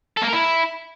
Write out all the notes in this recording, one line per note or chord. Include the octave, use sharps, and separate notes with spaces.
A4
A#3
A#4
E4